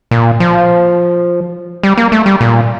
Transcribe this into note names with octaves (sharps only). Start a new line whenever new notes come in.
A#2
F3
G3
A#3
A3
G3
A#2